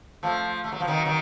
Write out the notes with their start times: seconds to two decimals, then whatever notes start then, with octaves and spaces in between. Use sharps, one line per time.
0.23 F3 A3
0.64 A3
0.72 F#3
0.80 F3
0.87 D#3 F#3
1.05 D#3 F#3